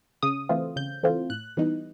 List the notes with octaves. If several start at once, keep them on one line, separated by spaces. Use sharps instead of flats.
C#3 D#6
E3 A3 C4 F4
C#3 G6
E3 A3 C4 F4
A2 F#6
E3 G3 B3 D#4